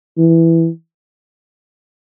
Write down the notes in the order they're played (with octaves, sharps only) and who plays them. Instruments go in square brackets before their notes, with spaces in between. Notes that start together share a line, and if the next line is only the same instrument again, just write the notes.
[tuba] E3